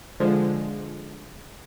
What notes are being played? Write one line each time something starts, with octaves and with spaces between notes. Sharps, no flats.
D3 F3 G#3